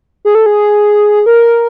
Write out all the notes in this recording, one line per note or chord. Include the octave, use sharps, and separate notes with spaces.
G#4
A4
G#4
A#4